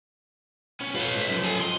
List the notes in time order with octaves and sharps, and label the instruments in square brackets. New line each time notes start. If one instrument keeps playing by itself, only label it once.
[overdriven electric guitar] B3 C#4
[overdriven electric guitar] F4 A4 [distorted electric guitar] B4 C#5
[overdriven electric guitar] G#2 E5
F#2 F3
[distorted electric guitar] A4 G#5
[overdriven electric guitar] F3 D#5 [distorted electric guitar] C6